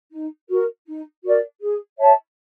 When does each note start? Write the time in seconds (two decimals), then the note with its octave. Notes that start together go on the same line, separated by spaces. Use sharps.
0.12 D#4
0.50 F#4 A#4
0.87 D#4
1.24 F#4 A#4 D5
1.61 G#4
1.98 C#5 E5 A5